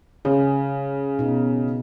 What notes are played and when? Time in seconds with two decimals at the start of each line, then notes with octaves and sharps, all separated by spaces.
0.25 C#3 G#4
1.19 B2 D#4